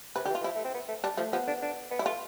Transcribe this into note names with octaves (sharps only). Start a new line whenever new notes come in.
C3 B4
D3 G4
E3
F4
E3
F3 E4
A3
C4
B3
A3
G3 D4
F3 A3
F3 B3
D4
D4
B3
G3 E4
A3 F4